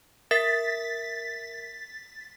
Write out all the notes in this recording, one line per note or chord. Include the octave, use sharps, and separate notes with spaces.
A#4 E5 A6 B6